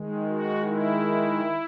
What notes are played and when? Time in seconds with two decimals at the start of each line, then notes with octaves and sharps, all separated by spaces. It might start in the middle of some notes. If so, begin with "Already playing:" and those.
Already playing: D#3 G#3
0.28 F#4
0.66 E4